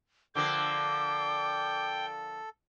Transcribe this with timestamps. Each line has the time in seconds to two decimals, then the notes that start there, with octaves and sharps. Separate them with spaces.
0.35 D3 F3 A#3 A4 G5 D6